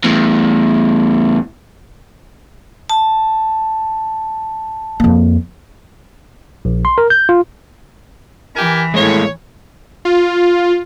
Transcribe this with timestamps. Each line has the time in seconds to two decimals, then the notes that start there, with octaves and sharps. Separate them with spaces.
0.04 E2 A2
2.89 A5
5.00 F2 A#3
6.65 A#1
6.85 C6
6.98 A#4
7.10 G6
7.29 F4
8.56 E3 G4 A#4 G#5
8.94 A2 G#3 A#3 C#5
10.05 F4